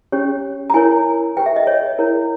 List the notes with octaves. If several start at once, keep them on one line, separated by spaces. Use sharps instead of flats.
C#4 G4 C#5
A#5
E4 A#4 C#5 G#5
G4 B4 G5
E5
D#5
C#5
E4 A#4 C#5